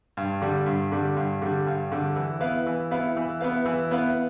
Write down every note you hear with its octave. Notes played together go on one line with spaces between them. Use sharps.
G2
D3 G3
G2
D3 G3
G2
D3 G3
G2
D3 G3
E3
B3 E4 B4 F5
E3
B3 E4 B4 F5
E3
B3 E4 B4 F5
E3
B3 E4 B4 F5